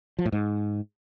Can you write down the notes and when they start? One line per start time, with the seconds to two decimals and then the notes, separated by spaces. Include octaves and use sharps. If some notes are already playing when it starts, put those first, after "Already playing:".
0.19 F3
0.25 A2
0.32 G#2